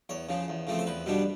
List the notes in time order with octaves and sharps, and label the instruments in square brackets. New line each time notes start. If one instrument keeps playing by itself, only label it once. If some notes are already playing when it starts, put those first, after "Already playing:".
[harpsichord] E2 C#5
C#3 F3
E2
C#3 F3 A3 C4
C5
E2 B4
B2 G3 B3 D4